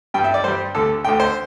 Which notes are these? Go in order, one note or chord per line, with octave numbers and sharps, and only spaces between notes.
G2 G3 G5
E5
D5
G2 G3 C5
D2 D3 A3 A4
D2 D3 A3 G5
C5